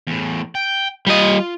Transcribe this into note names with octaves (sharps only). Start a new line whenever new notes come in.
E2 A2
G5
G3 F4 D#5